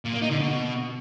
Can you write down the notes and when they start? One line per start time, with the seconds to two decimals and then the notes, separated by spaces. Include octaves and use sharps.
0.05 A#2
0.13 A#3
0.22 D#4
0.30 D3
0.39 B2